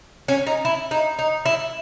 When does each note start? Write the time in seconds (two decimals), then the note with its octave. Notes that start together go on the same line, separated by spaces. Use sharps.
0.28 C#4
0.47 D#4
0.65 E4
0.91 D#4
1.19 D#4
1.46 E4